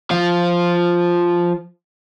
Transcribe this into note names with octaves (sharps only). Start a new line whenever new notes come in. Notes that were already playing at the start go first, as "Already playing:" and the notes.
F3 F4